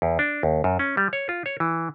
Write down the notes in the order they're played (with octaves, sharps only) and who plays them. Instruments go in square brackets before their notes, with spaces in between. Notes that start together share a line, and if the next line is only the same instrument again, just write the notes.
[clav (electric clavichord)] E2
D4
D#2
F#2
C#4
G3
C#5
F4
C#5
E3